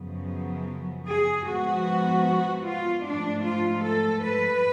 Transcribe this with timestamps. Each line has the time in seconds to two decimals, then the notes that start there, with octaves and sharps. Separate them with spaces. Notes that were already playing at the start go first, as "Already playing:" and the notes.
Already playing: F#2 C#3 F3 B3
1.07 G#4
1.47 G#2 F3 B3 F#4
2.64 F4
3.05 G#2 F3 A3 D4
3.44 F4
3.83 A4
4.23 B4